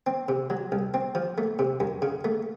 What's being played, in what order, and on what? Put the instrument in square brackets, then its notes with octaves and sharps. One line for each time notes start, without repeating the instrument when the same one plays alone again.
[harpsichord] C4
C3
F#3
C2
C4
F3
A3
C3
F#2
C#3
A3